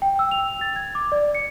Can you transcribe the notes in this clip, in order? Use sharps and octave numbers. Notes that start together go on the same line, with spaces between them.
G5
E6
F7
A6
G#6
D6
D5
C#7